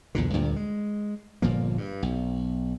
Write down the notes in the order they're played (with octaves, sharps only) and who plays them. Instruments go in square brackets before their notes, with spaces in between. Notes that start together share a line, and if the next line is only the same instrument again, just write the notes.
[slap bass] B1 E2 A#2 D3
D2 G2 A#2
G#3
G1 A#2 F3 A#3
G2
B1